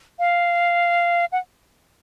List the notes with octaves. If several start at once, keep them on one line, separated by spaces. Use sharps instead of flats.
F5
F#5